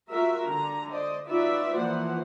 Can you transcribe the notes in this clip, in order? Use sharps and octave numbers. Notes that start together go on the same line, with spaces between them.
F4 F#4 A#4 E5
D3 A#5
C5 D5 D#5
D#4 F4 F#4 B4 D5 E5
E3 F3 A#3 C5 F#5